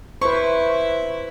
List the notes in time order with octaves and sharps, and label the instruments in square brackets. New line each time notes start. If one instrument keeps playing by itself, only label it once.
[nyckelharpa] E4 E5 [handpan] B4 C5 [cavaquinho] C#6